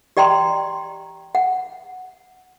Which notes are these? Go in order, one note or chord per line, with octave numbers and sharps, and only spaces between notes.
G4 D5 G5 A#5 C6
F#5